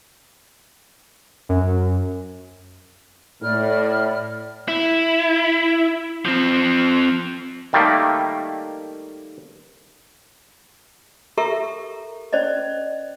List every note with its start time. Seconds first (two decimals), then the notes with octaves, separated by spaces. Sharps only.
1.49 F#2
3.42 A2 D5 B5 F6
4.68 E4
6.25 F3 C4
7.73 D#3 G3 A3 A#3
11.38 G4 A4 A#4 E5 A#5 C#6
12.33 C#4 C5 D5 D#5